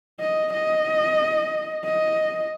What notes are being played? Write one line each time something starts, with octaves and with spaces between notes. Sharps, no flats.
D#5
D#5
D#5